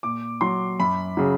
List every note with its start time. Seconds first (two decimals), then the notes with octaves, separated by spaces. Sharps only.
0.03 A#2 D6
0.41 F#3 C6
0.79 F#2 B5
1.17 C#3 F#3